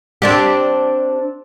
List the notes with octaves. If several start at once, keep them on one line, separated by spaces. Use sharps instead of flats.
C4 D4 G4